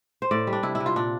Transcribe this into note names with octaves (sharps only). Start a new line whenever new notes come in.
C5
A2 D5
G3
D4
C3 E4
E4
C3
F4
A#2 D4